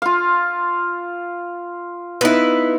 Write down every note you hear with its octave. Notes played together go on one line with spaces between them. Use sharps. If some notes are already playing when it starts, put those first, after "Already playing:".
F4 F5
B3 D#4 E4 B4